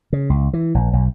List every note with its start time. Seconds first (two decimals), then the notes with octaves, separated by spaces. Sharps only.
0.13 C#3
0.30 C#2
0.53 E3
0.75 A#1
0.93 B1